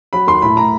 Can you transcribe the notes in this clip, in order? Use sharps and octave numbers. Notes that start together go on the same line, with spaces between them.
F#3 B5
D#2 C6
A2 B5
A2 A#5